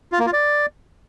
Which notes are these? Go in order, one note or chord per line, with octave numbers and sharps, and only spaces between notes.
F4
A#3
F4
D5